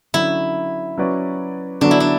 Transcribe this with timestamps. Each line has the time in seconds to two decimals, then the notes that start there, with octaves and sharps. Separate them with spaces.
0.14 D3 F#3 C#4 E4
0.98 F#3 C#4 F#4 B4 D5
1.81 D3 F#3 B3 D4 F#4 A4
1.91 E4
2.00 D4